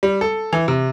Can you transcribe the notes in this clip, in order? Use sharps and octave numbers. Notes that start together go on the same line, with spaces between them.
G3
A4
E3
C3